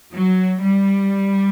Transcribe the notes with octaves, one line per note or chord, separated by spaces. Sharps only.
F#3
G3